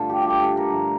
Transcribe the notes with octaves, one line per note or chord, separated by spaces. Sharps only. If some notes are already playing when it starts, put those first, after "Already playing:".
Already playing: G2 D3 A3 F4 A4
G4
G4
A4
A4
A#4
G2 F3 A3